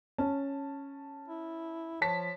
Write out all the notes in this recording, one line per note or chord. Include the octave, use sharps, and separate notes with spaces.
C#4 A5
E4
F3 C#5 A5 B6